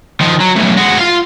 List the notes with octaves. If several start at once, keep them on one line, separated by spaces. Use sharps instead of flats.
D#3 F3
F#3
B1 A2
G#3 F#4
F4 F5